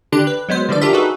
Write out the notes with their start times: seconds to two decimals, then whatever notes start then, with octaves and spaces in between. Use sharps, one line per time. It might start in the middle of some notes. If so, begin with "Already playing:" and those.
0.12 D3 D4 G4 F#6
0.27 B4
0.49 F#3 G#3 B3 C5
0.69 D3 E3 F3 G3 A4 D5
0.81 D4 F4 G4 A4 A#4 E5
0.93 D#4 F#4 G#4 A4 B4